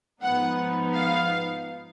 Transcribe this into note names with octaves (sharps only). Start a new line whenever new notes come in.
G#2 F3 B3 D#4 F#5
F5